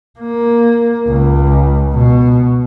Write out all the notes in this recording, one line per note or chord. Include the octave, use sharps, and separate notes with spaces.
A#3
C#2
B2